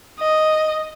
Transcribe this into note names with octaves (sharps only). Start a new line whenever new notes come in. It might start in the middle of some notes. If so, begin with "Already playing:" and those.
D#5